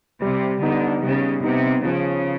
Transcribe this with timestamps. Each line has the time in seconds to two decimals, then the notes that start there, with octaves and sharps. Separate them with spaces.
0.22 C3 G3
0.62 D3 B3 D#4
1.03 C#3 G3
1.44 C3 B3 D#4
1.85 C#3 F3